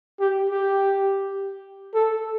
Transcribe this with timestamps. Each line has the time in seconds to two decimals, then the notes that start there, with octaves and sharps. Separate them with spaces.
0.20 G4
0.50 G4
1.94 A4